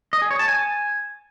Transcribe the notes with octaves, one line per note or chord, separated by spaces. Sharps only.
D#5
G#4
C#5
A5
G#5